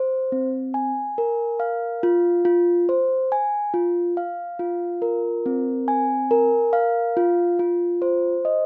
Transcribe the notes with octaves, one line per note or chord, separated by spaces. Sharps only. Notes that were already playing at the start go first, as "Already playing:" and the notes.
Already playing: C5
C4
G#5
A#4
F5
F4
F4
C5
G#5
F4
F5
F4
A#4
C4
G#5
A#4
F5
F4
F4
C5
D#5